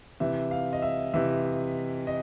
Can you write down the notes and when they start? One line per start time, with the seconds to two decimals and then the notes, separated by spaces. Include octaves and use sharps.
0.20 C3 E3 E5
0.51 F5
0.73 D#5
0.82 E5
1.14 C3 E3 E5
2.07 D#5